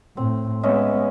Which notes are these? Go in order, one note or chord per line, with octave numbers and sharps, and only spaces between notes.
A2 C4
G#3 B3 C#4 D#5 E5